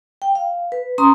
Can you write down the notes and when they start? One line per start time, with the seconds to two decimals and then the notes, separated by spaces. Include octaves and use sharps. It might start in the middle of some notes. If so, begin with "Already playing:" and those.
0.22 G5
0.35 F5
0.72 B4
0.98 C#4 A#5 C6 D#6